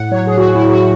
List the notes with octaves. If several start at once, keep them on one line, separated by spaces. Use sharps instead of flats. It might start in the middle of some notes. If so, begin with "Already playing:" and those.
Already playing: A2 F#5
F#3 C#5
G#4
A2 F#4
E4
F#3
F#4